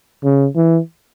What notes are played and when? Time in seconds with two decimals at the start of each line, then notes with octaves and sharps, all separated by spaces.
0.23 C#3
0.56 E3